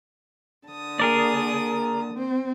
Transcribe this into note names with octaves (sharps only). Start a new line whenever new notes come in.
D3 A5 D#6
A#3 G#4 A#4 D5
C4 C5